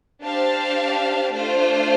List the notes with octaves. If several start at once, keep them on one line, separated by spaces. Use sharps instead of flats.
D4 G4 C5 F5 A5
A3 D4 F4 C5